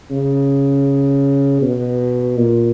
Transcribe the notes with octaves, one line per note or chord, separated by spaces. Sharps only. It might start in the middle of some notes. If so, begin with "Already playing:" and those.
C#3
B2
A#2